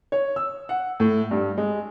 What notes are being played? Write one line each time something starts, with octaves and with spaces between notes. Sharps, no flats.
C#5
E6
F#5
A2
G2
G#3